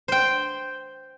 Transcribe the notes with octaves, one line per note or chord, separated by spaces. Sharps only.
C5 G5